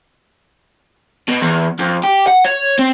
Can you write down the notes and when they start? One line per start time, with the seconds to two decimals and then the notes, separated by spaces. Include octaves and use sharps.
1.28 B2
1.41 E2
1.79 F2
2.04 G4
2.27 F#5
2.45 C#5
2.79 C4